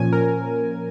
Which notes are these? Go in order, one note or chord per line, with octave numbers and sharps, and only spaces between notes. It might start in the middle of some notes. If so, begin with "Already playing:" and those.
Already playing: A#2 F3 C#4 G#5
A#4